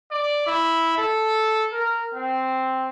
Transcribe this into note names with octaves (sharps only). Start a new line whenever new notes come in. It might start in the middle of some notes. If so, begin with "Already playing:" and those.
D5
E4
A4
A#4
C4